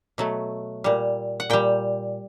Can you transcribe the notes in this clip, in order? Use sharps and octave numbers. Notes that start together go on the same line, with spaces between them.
B2 F#3 A3
A#2 G3
F#5
A#2 G3 G5